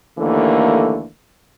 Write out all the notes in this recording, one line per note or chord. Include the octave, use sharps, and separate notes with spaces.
D#2 D3 E3 A3 A#3